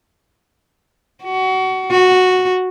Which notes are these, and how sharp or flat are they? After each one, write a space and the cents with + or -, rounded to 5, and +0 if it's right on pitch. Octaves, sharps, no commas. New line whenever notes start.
F#4 +25
F#4 -5